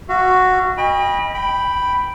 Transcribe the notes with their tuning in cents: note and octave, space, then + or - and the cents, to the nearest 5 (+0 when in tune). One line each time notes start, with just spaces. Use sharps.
F#4 +0 F5 -45
D#5 +0 G5 +35 B5 -20
G5 +0 B5 +0